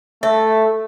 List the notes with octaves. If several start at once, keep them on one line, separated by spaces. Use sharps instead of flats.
A3 A4 E5